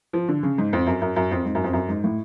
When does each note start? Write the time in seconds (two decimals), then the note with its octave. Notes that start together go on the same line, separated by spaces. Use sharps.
0.13 F3
0.29 D3
0.43 C#3
0.58 G#2
0.73 F2
0.87 F#2
1.02 F#2
1.16 F#2
1.31 F2
1.45 G#2
1.55 F#2
1.64 F2
1.73 F#2
1.89 G#2
2.04 A2